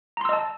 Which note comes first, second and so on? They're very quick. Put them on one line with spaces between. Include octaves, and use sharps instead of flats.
A#5 C6 E6 D#5 A5